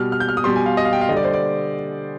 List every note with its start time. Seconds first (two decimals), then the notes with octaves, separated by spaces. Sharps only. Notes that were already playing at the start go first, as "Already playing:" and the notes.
Already playing: B2 G3 F6
0.12 F6
0.20 G6
0.29 F6
0.37 D#6
0.44 B2 G3 C6
0.56 G#5
0.66 F5
0.77 D#5
0.85 F5
0.93 G5
1.01 F5
1.09 D3 D#5
1.12 G3 D5
1.24 C5
1.33 D5